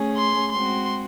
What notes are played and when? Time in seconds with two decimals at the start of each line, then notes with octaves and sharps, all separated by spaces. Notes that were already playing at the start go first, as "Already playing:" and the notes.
Already playing: A3 C#4 G#4
0.17 C6
0.52 G#3 C4 F#4 C6